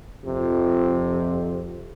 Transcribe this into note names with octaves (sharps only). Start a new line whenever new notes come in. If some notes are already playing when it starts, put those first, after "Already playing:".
F2 C3